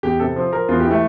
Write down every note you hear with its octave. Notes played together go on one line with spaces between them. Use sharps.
E2 G4
C3 A4
F3
F3 A#4
E2 F4
G4
E3
A3